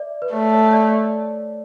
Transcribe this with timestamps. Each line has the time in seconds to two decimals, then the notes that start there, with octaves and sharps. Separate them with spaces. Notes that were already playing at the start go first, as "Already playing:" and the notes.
Already playing: D5 E5
0.22 B4
0.33 A3 C#5
0.53 C#5
0.73 D5